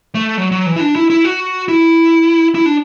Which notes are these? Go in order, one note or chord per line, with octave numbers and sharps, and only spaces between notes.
A3
F#3
F#3
E3
E4
D4
E4
E4
F#4
E4
E4
D4